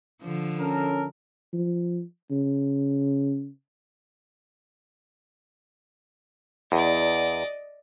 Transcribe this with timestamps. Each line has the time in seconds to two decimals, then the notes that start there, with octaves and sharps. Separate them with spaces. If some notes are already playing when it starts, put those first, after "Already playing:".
0.22 D3 F3
0.60 C#4 A4 A#4
1.53 F3
2.30 C#3
6.72 E2 D5 D#5